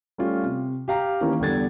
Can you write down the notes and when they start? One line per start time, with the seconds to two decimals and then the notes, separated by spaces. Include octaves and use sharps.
0.18 G3 A3 C#4 F4
0.44 C3
0.88 G4 F5 A#5
1.21 D#3 E3 A#3 C#4 G4
1.40 E2 D3 G3 D4 G#6 A6